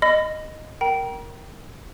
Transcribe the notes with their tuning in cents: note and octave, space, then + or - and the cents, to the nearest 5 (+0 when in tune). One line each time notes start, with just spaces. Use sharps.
D#5 -5 B5 +30
A#4 +0 G5 -20 A#5 +40